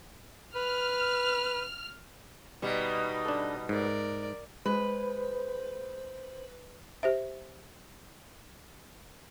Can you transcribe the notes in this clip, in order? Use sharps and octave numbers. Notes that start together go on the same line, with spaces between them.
B4 F6
B2 G3 D#4 D#5
D4 A4
G#2 A#4 D5
G#3 B4 C5
G4 C5 E5